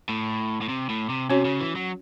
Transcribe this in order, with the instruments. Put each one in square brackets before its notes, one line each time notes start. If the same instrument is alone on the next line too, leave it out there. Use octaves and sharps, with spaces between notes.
[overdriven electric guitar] A2
A2
C3
A2
C3
[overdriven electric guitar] C3 [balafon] C#4 F#4 C#5
[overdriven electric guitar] C#3
E3
F#3